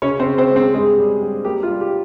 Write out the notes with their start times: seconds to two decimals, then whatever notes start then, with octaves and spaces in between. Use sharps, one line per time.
0.02 C#3 C#4 C#5
0.19 C4 C5
0.26 C#3
0.38 C4 C5
0.50 G#3
0.56 C4 C5
0.74 G2 G#3 G#4
0.98 G3
1.22 G3
1.45 A#3 G4
1.63 F4
1.68 G3
1.81 G4